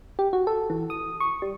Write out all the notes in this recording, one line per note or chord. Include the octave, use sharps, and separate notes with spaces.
G4
F#4
A4
E3
D#6
C#6
G3